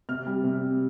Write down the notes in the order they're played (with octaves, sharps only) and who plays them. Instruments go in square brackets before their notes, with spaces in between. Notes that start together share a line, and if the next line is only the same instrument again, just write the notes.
[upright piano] C3 F6
G3
C3